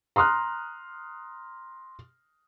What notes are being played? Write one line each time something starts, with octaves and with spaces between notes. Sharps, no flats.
A#5 C6 D#6 F6 F#6